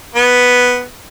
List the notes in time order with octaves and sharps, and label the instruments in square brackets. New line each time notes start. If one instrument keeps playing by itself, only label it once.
[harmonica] B3